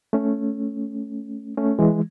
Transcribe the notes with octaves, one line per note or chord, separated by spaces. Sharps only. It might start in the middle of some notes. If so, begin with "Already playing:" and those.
A3 C#4
A3 C#4
E3 G#3